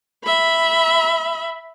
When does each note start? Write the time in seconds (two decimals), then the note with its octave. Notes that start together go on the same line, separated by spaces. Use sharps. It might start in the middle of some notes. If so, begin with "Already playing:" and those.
0.24 E5 B5